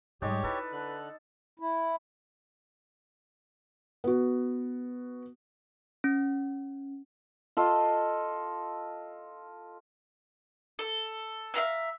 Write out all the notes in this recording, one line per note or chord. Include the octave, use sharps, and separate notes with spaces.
G#2 G3 G#3 D#4 G4 C#5 D5
E4 A4 B4
D3 F#6
E4
B3 F#4
C#4
F4 A4 D#5
A4
E5 F5 A#5 E6